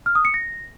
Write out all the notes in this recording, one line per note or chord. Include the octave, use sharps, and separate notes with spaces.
F6
D#6
C#7
A#6